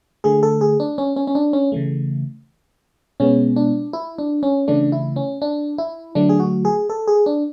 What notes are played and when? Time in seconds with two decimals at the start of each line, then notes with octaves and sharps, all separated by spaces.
0.24 D3 A3 G#4
0.43 A4
0.61 G#4
0.80 D4
0.98 C#4
1.16 C#4
1.27 C#4
1.35 D4
1.53 C#4
1.72 C#3 E3 A3
3.20 B2 G#3 B3 C#4
3.56 D4
3.93 E4
4.18 D4
4.43 C#4
4.68 C#3 E3 A3 D4
4.92 E4
5.16 C#4
5.42 D4
5.78 E4
6.15 D3 F#3 A3 D4
6.29 G#4
6.40 F#4
6.65 G#4
6.90 A4
7.08 G#4
7.26 D4